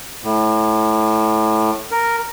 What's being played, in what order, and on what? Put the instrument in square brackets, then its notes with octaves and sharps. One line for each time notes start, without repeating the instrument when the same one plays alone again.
[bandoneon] A2
A#4